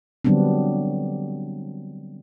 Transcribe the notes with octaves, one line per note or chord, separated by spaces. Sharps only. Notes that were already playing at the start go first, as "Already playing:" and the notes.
D3 F#3 G3 B3 C4 D4